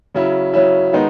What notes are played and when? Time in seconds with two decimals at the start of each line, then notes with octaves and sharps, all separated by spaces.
0.15 C#3 F#3 C#4 E4
0.53 C#3 F#3 C#4 E4
0.93 D#3 G#3 B3 D#4